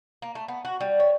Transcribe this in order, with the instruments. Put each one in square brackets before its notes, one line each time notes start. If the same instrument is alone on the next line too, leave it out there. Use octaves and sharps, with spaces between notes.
[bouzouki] A#3
A3
B3
F#4
G3
C#5